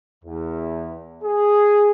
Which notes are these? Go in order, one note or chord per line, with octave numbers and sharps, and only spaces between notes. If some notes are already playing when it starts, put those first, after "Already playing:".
E2
G#4